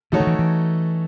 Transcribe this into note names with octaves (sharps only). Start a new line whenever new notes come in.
E3 A3 D#4 F#4 A4 C#5
D#3
E3
E3